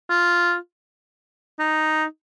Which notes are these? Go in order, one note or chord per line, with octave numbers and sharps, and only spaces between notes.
F4
D#4